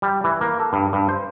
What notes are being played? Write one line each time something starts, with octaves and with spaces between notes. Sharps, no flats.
G3
E3
A#3
A4
G2
G2
C5